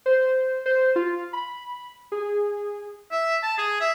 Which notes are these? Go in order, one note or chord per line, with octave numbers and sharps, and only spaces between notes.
C5
C5
F4
B5
G#4
E5
A5
G#4
E5